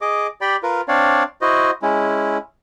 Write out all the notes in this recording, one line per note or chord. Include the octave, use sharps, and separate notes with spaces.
G#4 D#5 D6
G4 D5 G5 B5
F4 A#4 B4
C4 D4 C#5 D5 F5
E4 F#4 C5 D#5
G#3 C#4 E4